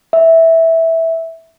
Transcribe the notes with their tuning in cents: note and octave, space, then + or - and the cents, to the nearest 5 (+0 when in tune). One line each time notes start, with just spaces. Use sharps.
E5 -10